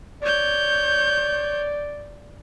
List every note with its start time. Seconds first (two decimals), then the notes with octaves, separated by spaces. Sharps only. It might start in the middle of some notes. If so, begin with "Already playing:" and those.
0.22 C#5 D5 G6